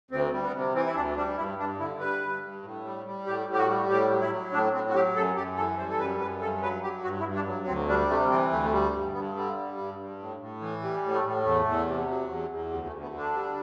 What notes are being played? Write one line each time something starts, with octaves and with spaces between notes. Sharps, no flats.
D2 C4
G3
B3
C3
E3 C4
E4
D2 D4
G3 D4
G2 E4
G2 D4
D3 E4
G3 B4
G2
G2
A2
G3
G3
A2 G4
A2
G4
F#4
G3
A2 G4
F#3
E4
F#3
A2 D4
A2 C4
F#4
F#3 G4
F#2 A4
F#2 G4
E3 A4
G3 C5
A4
F#2 B4
F#2 B4
G2 A4
F#3 B4
F#3 G4
G2 F#4
E4
G2
D4
F#3
D2 C4
G3 D4
C3 A3
E3 C4
D2 A3
A3
G3
G2
G2 B3
D3 G3
G3
G2
G2
A2
A2
E3
G3
A2
A3
A2
E2 A3
E2
C3
F#3
E2
E2
D2 G3
A3
D2
B3
D3
D4
G3